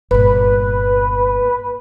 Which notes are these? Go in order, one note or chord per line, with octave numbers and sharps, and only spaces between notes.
G1 A#2 B4